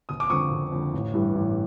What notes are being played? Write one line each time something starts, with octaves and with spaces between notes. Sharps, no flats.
F#1 D#6
D6
F2 D3 C#6 D#6
F#1
F2 D3
A1
G2 E3 G3
A1